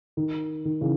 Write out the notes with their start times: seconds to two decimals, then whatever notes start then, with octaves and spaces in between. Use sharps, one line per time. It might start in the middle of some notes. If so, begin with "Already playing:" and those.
0.17 D#3
0.65 D#3
0.81 C#3 E3